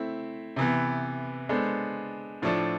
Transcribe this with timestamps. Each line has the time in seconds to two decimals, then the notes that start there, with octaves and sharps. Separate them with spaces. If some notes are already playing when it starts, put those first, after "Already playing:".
Already playing: A3 C4 E4
0.56 C3 E3 B3
1.49 G#3 B3 D4 A4 C5
2.42 A2 F3 A3 D4 A4